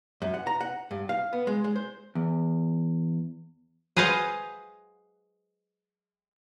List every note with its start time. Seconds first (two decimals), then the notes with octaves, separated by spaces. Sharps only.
0.22 F#2
0.34 F#5
0.47 A#5
0.61 F#5
0.91 G2
1.09 F5
1.33 B3
1.47 G#3
1.64 G#3
1.76 C5
2.15 E2
3.97 G#4 B4 C5 D#5 F5 F#5